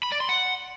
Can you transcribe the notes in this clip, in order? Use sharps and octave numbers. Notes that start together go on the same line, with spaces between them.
B5
D5
C6
F#5